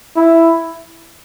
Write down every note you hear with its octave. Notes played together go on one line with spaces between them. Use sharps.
E4